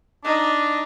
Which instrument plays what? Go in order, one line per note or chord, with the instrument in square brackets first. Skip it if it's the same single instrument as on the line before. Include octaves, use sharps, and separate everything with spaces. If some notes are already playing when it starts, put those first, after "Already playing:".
[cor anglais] D4 [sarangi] D#4